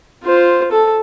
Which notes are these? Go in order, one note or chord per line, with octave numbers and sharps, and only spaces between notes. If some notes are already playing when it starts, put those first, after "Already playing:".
F4 C5
A4